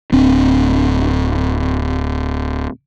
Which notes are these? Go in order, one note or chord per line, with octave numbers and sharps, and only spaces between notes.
D1 C4 D4